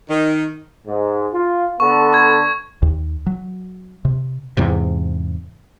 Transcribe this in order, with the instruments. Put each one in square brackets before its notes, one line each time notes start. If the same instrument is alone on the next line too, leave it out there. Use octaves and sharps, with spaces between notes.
[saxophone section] D#3
[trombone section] G#2
F4
[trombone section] D3 B3 A4 [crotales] C#6
[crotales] C#6 G#6
[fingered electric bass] D#2
F#3
C3
[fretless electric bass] E2 G#2 C3